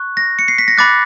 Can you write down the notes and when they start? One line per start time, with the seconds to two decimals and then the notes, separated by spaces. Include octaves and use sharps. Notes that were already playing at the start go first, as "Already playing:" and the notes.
Already playing: C#6 F#6
0.17 A#6
0.39 C#7
0.48 C7
0.58 B6
0.68 A#6
0.78 B5 D6 F#6 A6